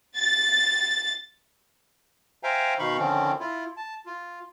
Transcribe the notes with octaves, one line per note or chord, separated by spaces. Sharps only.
A6
C5 E5 F5 G5 G#5 A#5
B2 D#3 D#4 F5 B5 C#6
D3 D#3 F3 C4 C#4
E4 F4
A5
F4